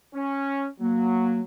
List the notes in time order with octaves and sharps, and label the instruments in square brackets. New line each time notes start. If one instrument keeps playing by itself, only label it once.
[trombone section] C#4
[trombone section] F#3 [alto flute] A#3